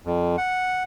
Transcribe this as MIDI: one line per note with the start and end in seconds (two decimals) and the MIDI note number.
0.05 0.36 41
0.38 0.83 78